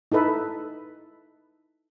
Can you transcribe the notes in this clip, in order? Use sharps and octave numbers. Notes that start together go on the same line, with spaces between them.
D#4 E4 A4 B4 E5